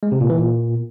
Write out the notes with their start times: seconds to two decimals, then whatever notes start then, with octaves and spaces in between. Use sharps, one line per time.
0.03 G#3
0.12 C3
0.21 A#2
0.30 E3
0.39 A#2